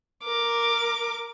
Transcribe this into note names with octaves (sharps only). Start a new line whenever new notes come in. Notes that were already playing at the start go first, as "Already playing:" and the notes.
A#4 D6